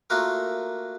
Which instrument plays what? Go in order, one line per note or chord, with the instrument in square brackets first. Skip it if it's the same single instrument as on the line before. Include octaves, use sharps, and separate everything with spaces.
[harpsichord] A3 A#3 F4 F#4 A#4